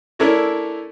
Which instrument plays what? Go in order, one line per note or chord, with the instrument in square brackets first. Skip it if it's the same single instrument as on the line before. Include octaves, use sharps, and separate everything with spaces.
[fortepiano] A3 C#4 D4 E4 A4 A#4